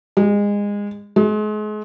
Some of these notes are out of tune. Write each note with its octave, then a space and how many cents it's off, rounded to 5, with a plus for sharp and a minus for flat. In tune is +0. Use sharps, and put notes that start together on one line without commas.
G#3 -25
G#3 +35